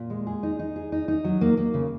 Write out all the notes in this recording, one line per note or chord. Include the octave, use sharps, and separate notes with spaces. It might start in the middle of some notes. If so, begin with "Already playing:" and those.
Already playing: A#2
G#3
G#4
D#4
D#4
G#4
D#4
D#4
F#3
A#3
A#3
C#3